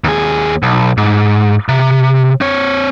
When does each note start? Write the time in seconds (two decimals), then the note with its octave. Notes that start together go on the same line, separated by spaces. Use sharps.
0.04 D#2 G#4
0.63 B1
0.97 G#2
1.69 C3
2.41 C4 C#5